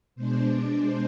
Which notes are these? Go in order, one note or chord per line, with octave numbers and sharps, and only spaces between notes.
B2 G#3 D4 C5
D5
C5